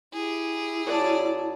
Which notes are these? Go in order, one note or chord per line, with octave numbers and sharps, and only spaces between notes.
E4 G4 G#4
F#2 D5 A5